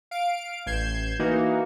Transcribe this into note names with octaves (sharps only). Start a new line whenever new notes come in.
F5 D7
A1 G6 G#6 C7 E7
E3 A#3 D#4 F#4